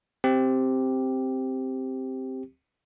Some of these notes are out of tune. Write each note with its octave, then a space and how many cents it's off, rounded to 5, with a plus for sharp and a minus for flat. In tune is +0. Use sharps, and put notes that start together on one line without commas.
C4 +0 G4 +0